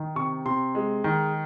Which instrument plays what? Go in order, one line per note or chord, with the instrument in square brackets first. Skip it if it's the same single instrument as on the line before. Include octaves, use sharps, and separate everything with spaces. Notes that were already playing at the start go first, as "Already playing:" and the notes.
Already playing: [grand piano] D#3
C3 C#6
C3 C6
G#3
D#3